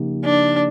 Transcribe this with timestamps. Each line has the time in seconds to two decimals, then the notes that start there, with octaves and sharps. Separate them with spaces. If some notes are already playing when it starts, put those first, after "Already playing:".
Already playing: C#3 F3 A#3 D#4 G4
0.25 D4